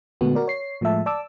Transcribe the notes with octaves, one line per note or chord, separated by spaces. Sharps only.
A#2 D3 G#3 A3 B3 F#4
F#4 A#4 D5
C#5 C7
A2 F3 G#3 A3 E5 A5
D5 A5 D6 E6